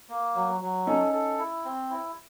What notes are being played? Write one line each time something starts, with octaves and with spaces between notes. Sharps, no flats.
A#3
F#3
F#3
C#4 D#4 A4
A4
E4
C4
E4